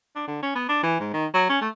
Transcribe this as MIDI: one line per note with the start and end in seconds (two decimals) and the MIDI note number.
0.15 0.25 62
0.27 0.38 50
0.43 0.51 61
0.55 0.65 59
0.69 0.83 62
0.83 0.97 52
1.00 1.10 44
1.13 1.26 51
1.34 1.45 54
1.50 1.60 61
1.61 1.69 57